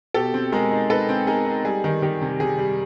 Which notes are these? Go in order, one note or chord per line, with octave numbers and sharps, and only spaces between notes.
B2 G4 A4
C4
G#3 G#4 A#4
D#4
D#4 A4 B4
C4
D#4 G#4 A#4
D#4
G3 G#4
D#3
D#3 G4
C3
C3 G#4
G3